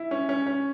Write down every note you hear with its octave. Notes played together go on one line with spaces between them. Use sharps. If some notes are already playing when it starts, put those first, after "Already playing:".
Already playing: E4
C#4
C#4
C#4